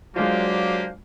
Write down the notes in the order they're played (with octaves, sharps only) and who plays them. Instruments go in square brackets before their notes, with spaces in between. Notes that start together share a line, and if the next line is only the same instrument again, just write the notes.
[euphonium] F#3 [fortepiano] G#3 F4 [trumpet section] A#3 G4 [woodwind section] D4 C5 F5